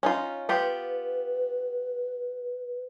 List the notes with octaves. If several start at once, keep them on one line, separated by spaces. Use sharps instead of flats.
C#4 D#4 F4
B3 F4 G4 B4